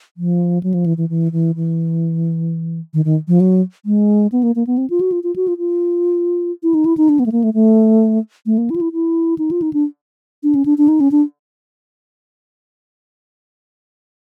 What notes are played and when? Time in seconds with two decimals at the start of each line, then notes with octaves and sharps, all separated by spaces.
0.17 F3
0.63 F#3
0.74 F3
0.86 E3
0.97 E3
1.09 E3
1.32 E3
1.56 E3
2.94 D#3
3.05 D#3
3.28 F3
3.40 F#3
3.86 G#3
4.32 B3
4.43 A#3
4.56 A#3
4.67 B3
4.78 C4
4.90 F4
5.01 F#4
5.12 F4
5.23 F4
5.36 F#4
5.48 F4
5.58 F4
6.63 E4
6.74 D#4
6.85 E4
6.97 D#4
7.09 D4
7.19 B3
7.26 A3
7.32 A#3
7.44 A3
7.54 A3
8.46 A3
8.58 A#3
8.70 E4
8.76 F4
8.81 E4
8.93 E4
9.38 D#4
9.51 F4
9.62 D#4
9.73 D4
10.43 D4
10.55 C#4
10.66 D4
10.78 D4
10.88 D#4
11.00 C#4
11.12 D4